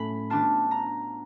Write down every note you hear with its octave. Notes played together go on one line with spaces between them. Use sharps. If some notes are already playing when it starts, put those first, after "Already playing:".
Already playing: A2 F#3 A3 C#4 B5
F#3 B3 D4 F4 A5
A#5